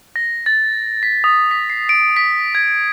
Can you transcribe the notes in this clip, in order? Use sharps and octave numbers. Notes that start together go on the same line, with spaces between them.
A#6
A6
B6
D#6
B6
C7
D7
B6
G#6